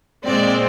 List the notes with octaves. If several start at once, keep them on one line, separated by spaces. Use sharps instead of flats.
A#2 G#3 C4 D5